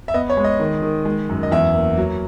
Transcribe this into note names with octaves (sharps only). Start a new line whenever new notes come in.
E5
B3 D#5
C#5
G#3
D#5
D#3
D#3
G#3
F#2
D#5
E2 E5
A#3
F#3